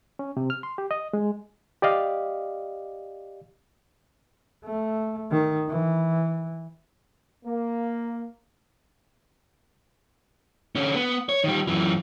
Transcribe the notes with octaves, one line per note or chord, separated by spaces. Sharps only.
C#4
C3
F6
C6
G4
D#5
G#3
G4 D5 D#5 F5
A3
D#3
E3
A#3
D3 C#4
B3
C#5
D#3 G3
F#2 E3